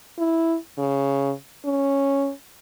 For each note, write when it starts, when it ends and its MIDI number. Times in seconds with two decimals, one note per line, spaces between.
0.18 0.56 64
0.78 1.31 49
1.65 2.31 61